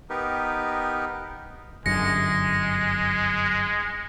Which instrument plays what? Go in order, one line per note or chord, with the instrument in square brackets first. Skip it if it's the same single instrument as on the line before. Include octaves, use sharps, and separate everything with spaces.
[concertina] B3 D#4 G4 A#4 B4
[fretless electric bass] G1 F#2 D3 [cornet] G#3 [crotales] A#6 C#7